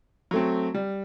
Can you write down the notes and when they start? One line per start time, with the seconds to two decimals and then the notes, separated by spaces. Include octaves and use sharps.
0.31 F#3 A3 C4
0.74 G3